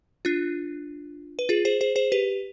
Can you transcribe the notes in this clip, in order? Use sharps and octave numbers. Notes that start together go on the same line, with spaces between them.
D4 F4
B4
F4 G#4
G#4 C5
G#4 C5
G#4 C5
G4 B4